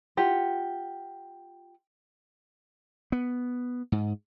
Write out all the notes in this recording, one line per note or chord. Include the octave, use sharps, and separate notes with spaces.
F4 G4 F#5
B3
G#2